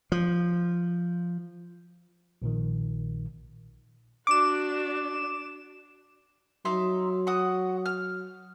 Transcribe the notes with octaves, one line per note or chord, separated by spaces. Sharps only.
F3
A#1 A#2 D#3
D4 F#4 D6 E7
F#3 D#4 E5 C6
F#4 F#5 D#6
F6